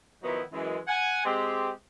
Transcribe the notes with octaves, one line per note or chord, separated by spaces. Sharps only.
D#3 F3 F#3 B3 D#4 E4
F#2 E3 G#3
F#5 G#5
G#3 C4 G4